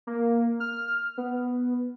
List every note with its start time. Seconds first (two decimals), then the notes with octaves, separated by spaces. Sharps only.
0.07 A#3
0.60 F6
1.18 B3